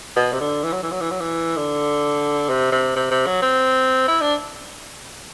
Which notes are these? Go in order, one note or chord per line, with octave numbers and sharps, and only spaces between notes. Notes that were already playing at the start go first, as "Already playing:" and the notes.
B2
C3
D3
E3
F#3
E3
F#3
E3
F#3
E3
D3
C3
C3
C3
C3
F#3
C4
E4
D4